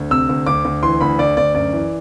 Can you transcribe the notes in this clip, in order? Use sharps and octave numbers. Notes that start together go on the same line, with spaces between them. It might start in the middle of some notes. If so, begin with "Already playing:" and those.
Already playing: D2
C3 E6
D2
D2 D6
D2
E3 C6
D2 B5
D2 D5
D2 D5
F#2 D5
E3